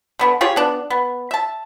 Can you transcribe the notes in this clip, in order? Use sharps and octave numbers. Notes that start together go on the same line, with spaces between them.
D3 B3 D4
F4 G4 G#4 C#5
B3 D4
B3
E5 A5